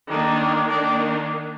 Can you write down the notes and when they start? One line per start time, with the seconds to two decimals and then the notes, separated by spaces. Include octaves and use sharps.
0.09 D#3 A#3 D4
0.68 D#3 A#3 D4 D5